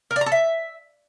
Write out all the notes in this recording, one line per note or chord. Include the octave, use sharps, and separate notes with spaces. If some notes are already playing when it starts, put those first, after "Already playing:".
A#4
D5
A#5
A4
E5